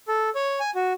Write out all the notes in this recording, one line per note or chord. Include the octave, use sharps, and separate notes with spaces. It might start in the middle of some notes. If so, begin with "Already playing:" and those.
A4
C#5
G#5
F#4